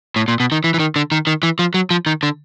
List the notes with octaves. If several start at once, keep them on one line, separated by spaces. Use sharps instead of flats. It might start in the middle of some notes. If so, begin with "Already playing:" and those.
A2
A#2
B2
D#3
E3
E3
D#3
D3
D#3
D#3
E3
F3
F#3
F3
D#3
D3